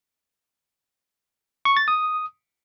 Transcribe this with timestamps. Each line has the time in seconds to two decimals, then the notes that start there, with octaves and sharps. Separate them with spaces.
1.65 C#6
1.77 A6
1.88 D#6